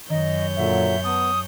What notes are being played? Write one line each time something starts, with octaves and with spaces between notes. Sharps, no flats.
F#2 D#3 C#5 D#5 G6
A#2 D3 F#3 E5
B3 A5 A#5 D#6